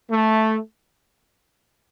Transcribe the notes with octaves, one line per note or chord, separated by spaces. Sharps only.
A3